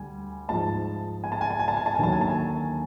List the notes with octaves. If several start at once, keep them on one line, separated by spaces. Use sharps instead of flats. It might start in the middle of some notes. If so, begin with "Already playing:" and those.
Already playing: D2 G3 G#5
G#2 F3 G#3 A5
G#5
A5
G#5
A5
G#5
A5
G#5
A5
G#5
D#2 D3 F#3 A5
G#5
A5
G#5